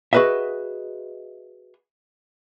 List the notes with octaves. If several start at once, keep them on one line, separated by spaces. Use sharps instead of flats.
F#4 G#4 B4 D#5 E5